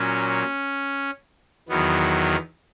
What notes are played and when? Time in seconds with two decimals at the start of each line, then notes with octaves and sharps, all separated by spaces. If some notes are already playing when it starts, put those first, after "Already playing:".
Already playing: A#2 F#3 C#4
1.68 E2 D#3 F#3 B3